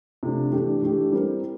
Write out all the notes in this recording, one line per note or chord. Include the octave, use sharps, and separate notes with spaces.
C3 F3 A3 D4
E3 A3 D4 G4
E3 A3 D4 G4
G3 C4 E4 A#4